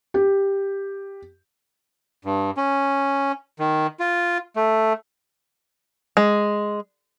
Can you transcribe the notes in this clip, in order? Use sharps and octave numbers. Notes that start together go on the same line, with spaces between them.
G4
G2
C#4
D#3
F4
A3
G#3